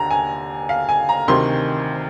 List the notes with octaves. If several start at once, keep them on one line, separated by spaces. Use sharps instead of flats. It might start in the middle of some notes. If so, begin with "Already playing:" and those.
Already playing: D#2 D3 A#5
G#5
F5
G#5
A#5
D2 C3 D#3 C6